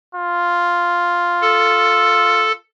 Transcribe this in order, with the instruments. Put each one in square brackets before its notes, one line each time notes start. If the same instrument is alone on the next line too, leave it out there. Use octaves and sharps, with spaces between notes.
[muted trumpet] F4
[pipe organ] A4